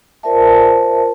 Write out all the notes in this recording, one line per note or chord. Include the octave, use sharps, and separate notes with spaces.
F4 A#4 C5 D5 E5 A5